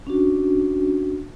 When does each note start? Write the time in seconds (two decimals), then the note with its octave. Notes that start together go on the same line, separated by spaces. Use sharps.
0.07 C#4 D4 F#4